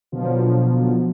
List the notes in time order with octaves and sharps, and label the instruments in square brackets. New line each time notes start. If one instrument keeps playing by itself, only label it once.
[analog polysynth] B2 D3 F3 F#3